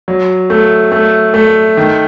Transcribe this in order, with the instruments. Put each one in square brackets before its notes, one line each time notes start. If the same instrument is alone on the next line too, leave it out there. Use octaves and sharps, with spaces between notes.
[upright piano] F#3
A3
A3
A3
D#3